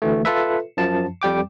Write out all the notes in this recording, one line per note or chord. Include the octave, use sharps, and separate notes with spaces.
D2 E3 A3
F4 A4 B4 E5
F#2 F3 A5
F2 G3 G5 D6